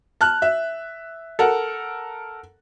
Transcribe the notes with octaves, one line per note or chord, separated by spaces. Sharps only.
A5 F6 F#6
E5
A4 A#4 F#5